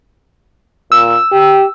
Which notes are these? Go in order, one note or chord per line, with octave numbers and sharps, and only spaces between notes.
A#2 E6
G4